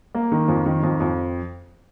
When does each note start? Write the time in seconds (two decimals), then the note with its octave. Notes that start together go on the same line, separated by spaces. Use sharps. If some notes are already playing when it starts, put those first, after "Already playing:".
0.15 A#3
0.32 D#3
0.48 F2
0.66 D#3
0.83 F2
1.00 F2